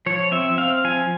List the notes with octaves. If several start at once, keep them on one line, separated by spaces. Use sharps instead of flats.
F3 C#5
C4 E5
C4 F5
F3 G#5